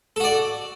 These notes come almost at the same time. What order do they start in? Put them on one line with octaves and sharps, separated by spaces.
A4 F#4 D5